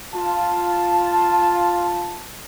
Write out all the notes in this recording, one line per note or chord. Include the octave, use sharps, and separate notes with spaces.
F4 A5